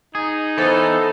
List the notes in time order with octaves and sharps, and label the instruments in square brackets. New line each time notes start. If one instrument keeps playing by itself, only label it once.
[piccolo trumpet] D#4 [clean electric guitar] G#4
[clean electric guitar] E3 B3 [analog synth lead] A4 [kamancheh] C5